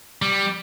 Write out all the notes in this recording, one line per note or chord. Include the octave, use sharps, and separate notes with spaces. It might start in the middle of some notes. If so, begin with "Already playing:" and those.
G3